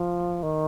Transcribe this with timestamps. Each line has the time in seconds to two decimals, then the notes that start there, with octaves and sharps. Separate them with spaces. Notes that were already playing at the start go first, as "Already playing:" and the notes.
Already playing: F3
0.43 D#3